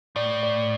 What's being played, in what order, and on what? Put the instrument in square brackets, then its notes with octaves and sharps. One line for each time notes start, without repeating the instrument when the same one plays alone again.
[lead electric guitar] A2 [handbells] D5
[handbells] D5